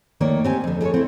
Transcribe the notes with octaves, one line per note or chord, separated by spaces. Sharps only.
D2 D#3 A#3 C#5 D5
C4 G4 G#5
F2 D3
G#3 A4 A#4 C#5
C4 E4